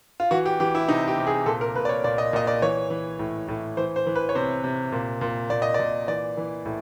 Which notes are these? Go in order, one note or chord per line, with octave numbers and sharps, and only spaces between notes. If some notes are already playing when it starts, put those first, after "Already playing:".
F4
E3 F#4
G4
E3 G4
E4
C3 D#4
G4
C3
G#4
A#2 A4
A#4
A#2 B4
D5
C#5
A#2 D5
D#5
A#2 D#5
D5
E3 C#5
E3
A2
A2
E3 C5
C5
E3
B4
C#5
C3 C5
C3
A#2
A#2
A#2 D5
D#5
A#2 D5
E3 D5
E3
A2